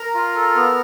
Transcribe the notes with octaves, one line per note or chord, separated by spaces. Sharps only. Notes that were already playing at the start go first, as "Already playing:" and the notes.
Already playing: A#4 A#5
F4
A4
B3